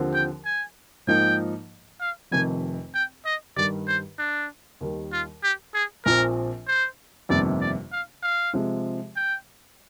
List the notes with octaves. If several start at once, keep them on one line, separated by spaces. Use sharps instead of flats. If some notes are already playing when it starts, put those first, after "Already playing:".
Already playing: D#2 D3 F3 C4 G4
G5
G#5
G#2 F3 A#3 D#4 G5
F5
F1 F2 C3 D#3 G#5
G5
D#5
G2 D#3 G3 D5
C5
D4
D#2 D#3 G3
F4
G4
G#4
A#1 A#2 F3 C4 A#4
C5
G1 F2 C3 D#3 A#3 D5
D5
F5
F5
C3 F3 G#3
G5